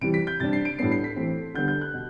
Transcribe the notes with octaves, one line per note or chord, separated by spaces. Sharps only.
C3 E3 G3 D7
B6
G6
C3 G3 D4 A6
C7
D7
A2 G3 B3 D4 C7
C7
B6
E3 A3 C4
D3 G3 B3 G6
G6
F#6
B2